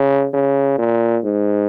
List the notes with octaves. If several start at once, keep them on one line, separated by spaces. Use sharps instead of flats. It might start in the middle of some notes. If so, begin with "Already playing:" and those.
Already playing: C#3
C#3
A#2
G#2